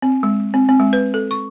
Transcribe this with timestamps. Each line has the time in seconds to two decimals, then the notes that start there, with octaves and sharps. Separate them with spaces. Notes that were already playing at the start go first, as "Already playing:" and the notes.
0.02 C4
0.23 G#3
0.54 C4
0.69 C4
0.80 G#3
0.93 B4
1.14 A4
1.31 C#6